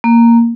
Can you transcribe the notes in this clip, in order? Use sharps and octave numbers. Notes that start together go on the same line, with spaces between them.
A#3